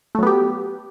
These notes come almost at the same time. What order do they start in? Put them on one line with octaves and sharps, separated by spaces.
A3 F#3 B3 G4